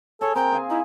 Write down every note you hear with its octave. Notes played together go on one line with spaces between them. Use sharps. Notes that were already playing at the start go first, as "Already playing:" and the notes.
G#4 A4 C#5
C4 A#4 G5
G#4 F5 G#5
D#4 E4